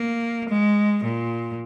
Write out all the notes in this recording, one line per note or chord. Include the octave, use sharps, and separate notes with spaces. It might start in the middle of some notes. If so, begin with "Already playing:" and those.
Already playing: A#3
G#3
A#2